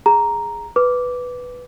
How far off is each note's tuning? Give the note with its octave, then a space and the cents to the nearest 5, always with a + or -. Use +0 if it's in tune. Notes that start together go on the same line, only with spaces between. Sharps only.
G#4 +0 A#5 +0
B4 +0 D6 -15